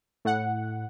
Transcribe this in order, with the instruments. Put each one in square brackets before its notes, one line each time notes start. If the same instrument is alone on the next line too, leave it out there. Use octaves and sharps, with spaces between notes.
[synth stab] A2 F#5